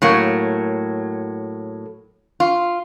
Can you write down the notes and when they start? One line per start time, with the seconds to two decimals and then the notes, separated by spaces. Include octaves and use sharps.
0.02 A2 F#3 A#3
2.40 F4